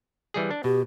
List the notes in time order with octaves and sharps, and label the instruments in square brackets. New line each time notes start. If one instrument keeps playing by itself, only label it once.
[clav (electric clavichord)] E3 G3 G#4
D4
[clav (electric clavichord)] B2 [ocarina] G4